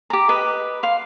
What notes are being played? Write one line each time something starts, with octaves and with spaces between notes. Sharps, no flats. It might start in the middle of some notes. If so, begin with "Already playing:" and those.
G4 A#5
B4 D#5
F5 C6